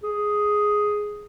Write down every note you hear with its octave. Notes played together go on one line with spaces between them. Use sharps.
G#4